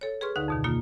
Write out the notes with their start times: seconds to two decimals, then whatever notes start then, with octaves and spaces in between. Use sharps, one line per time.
0.01 A4 C#5
0.21 G#4 B4 C6 C#6 F6
0.36 D2 D3 D#4 B4 F5
0.48 F2 B2 D#3
0.64 B2 D#3 A#3 F4